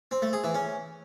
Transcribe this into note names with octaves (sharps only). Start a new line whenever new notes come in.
C4
A3
G#4
E3
C#4